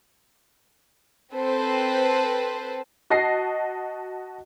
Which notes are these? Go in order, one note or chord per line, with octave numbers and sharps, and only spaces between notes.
C4 A4 B4 C5
F#4 D#5 A5 A#6 C7